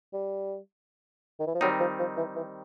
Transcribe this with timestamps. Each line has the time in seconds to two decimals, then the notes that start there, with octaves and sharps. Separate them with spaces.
0.13 G3
1.39 D#3
1.47 E3
1.55 F3
1.61 D#3 F#3 G3 C4 D#4
1.80 F3
1.99 F3
2.17 E3
2.36 E3